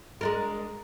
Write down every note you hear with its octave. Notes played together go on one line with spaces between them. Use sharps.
G#3 D4 A#4